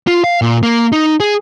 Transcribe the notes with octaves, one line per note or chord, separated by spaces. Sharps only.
F4
F5
A#2
A#3
D#4
G#4